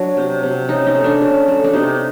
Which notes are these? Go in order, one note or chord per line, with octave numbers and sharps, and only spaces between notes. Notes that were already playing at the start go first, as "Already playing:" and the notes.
Already playing: F#3 D4
C3
C3
C#3 D#4
D#4
A3
D4
C#3
A3
D4
C3 D#4